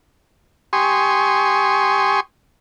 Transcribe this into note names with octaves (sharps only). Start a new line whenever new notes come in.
G4 G#5 C6 C#6 D#6